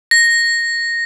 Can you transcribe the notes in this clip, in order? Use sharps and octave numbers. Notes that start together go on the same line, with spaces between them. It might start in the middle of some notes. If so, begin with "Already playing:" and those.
A#6